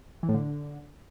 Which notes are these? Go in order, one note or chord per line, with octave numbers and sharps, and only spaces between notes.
E3
A2
D3